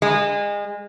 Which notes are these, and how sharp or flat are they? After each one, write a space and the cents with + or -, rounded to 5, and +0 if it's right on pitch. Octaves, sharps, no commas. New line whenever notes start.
G#3 -30